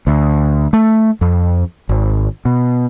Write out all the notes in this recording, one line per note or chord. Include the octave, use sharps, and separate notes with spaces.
D2
A3
F2
G#1
B2